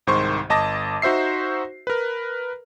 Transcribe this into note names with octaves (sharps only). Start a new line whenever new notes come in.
C2 G#2 D#3 C5 C6 C#6
G1 D#5 A5 D6 A#6
D#4 F#4 C5 E5 C7
A#4 B4